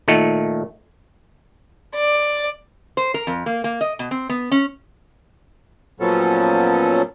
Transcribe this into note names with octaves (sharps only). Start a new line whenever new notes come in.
A#2 D#3 A3
D5
C5
A#4
F2
A#3
A#3
D#5
B2
C4
B3
C#4
A#2 F3 F#3 B3 C#4 A4